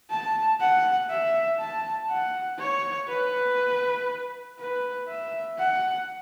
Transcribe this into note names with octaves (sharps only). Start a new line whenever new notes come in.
A5
F#5
E5
A5
F#5
C#5
B4
B4
E5
F#5